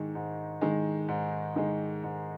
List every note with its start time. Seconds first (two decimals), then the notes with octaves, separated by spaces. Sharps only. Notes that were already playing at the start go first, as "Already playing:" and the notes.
Already playing: G#2 D#3 G#3
0.15 G#2
0.61 D#3 G#3
1.08 G#2
1.56 D#3 G#3
2.03 G#2